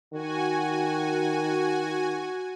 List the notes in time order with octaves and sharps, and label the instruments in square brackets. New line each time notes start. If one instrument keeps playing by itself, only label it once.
[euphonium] D#3 [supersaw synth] F#4 G#5